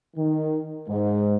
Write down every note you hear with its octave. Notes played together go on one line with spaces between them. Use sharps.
D#3
G#2